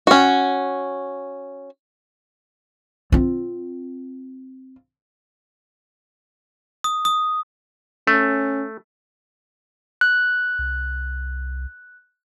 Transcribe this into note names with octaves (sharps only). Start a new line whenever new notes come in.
C#4 F#4
C4 F4
D#6
D#6
A3 C#4
F#6
C2